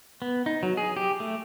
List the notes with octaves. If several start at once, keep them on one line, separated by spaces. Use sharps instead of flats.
B3
D#4
F#3
G#4
G4
A3